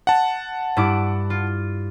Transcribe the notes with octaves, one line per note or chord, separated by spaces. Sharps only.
F#5 A5
G2 E4 D6
F4